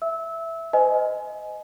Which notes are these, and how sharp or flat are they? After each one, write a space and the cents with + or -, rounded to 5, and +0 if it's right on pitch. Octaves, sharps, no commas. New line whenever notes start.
E5 +5 E6 -20
C5 -40 D#5 +0 G#5 +15